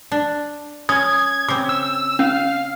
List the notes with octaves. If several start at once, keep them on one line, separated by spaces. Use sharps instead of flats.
D4
C#4 D#6 G#6
C#3 C4 D6
E6
C#4 F5